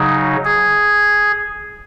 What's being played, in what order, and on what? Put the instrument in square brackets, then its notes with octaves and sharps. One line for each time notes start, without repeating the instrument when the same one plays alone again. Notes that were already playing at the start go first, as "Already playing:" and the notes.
Already playing: [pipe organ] C#3 F#3 D#4
G#4